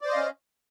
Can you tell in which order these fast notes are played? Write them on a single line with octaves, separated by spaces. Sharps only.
D5 C5 D#5 F5 C#4